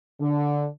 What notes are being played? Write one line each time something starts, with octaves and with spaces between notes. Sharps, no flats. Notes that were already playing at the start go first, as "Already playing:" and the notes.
D3